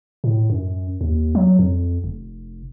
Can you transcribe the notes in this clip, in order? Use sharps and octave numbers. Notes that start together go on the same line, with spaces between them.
A2
F#2
D#2
F#3
F2
F1